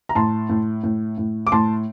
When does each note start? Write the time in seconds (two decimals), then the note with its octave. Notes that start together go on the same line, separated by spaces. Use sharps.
0.09 A#5
0.15 A2 A5 C6
0.49 A2
0.84 A2
1.18 A2
1.47 D6
1.52 A2 A5 C6